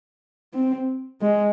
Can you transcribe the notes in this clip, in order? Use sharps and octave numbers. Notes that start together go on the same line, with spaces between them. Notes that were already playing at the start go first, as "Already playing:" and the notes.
C4
G#3